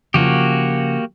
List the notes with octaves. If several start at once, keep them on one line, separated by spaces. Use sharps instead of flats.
C#3 F3 A#3 F#4 G4